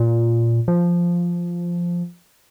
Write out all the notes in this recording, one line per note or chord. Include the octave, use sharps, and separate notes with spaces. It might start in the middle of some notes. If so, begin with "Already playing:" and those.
Already playing: A#2
F3